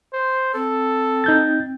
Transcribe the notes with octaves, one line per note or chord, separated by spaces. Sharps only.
C5
C4 A4
D#4 G6 A6